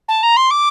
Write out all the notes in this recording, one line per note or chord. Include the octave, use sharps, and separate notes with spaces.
A5
A#5
C6
D6